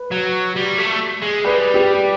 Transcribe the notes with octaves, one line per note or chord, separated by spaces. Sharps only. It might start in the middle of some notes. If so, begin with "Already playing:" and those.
Already playing: B4
F#3
G3
A3
G#3
G3 B4
G4